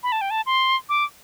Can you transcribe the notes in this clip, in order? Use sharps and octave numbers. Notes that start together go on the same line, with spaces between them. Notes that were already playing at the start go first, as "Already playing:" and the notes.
B5
A5
G5
A5
C6
D6